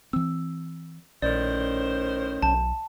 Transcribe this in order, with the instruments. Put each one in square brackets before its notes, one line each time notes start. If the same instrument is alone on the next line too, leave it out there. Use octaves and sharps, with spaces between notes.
[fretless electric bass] E3 C4 [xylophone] E6
[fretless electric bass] A#1 [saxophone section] A2 D#3 C5 [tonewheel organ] C#4 [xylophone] D5
[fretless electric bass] B1 [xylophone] A5